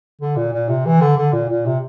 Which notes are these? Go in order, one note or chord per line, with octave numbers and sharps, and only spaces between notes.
D3
A#2
A#2
C3
E3
D3
D3
A#2
A#2
C3